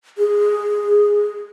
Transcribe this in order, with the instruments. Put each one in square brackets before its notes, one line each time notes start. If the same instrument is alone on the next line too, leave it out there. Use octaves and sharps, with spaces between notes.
[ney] G#4